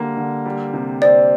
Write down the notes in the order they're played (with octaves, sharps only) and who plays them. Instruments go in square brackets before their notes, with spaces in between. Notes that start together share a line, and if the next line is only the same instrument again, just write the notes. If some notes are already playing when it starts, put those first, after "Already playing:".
Already playing: [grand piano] D3 G3 A#3
D3
G3
C3
[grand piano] C4 [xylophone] D5